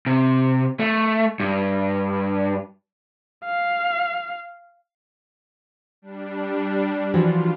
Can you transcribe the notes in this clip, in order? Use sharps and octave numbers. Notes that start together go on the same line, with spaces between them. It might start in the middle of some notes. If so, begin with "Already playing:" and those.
C3
A3
G2
F5
G3 D4
E3 F3 F4 F#4